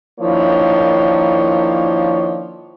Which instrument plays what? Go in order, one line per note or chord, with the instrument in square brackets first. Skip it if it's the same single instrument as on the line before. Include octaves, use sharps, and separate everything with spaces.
[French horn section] D#3 F3 A#3 D4 E4 C#5